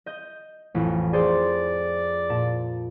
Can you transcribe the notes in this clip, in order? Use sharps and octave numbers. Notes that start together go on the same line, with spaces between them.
D#5 G6
A1 F2
G#4 A4 C5 D5
A#2 A5